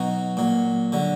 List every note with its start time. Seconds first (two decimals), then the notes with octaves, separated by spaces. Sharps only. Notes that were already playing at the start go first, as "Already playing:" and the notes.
Already playing: B2 F#3 D#4
0.37 A#2 F#3
0.92 D3 F#3